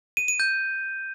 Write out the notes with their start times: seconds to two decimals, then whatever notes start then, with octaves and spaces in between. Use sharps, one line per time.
0.17 D#7
0.28 D#7
0.40 G6